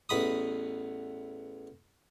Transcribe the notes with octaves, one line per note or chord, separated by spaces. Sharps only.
A1 E2 B5 D#6